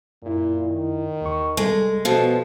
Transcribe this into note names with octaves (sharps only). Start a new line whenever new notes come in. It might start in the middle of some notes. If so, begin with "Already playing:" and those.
F#2 A#2 E4
D#3
D#2 C#6
C2 G3 G#3 A4
B2 F3 F#4 A4